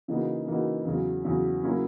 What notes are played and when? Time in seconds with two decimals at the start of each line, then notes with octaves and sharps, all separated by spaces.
0.08 C#3 E3 A#3 D#4 F#4
0.47 C#3 E3 A#3 D#4 F#4
0.85 E2 C#3 F#3
1.25 E2 C#3 F#3
1.63 C#3 F#3 A#3 C#4 E4